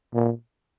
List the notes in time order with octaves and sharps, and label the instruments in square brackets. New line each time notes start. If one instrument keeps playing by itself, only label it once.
[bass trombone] A#2